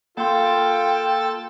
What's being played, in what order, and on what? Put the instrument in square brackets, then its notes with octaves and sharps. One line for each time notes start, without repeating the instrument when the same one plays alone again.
[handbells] A#3 C6 [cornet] F4 [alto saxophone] A4 [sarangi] G5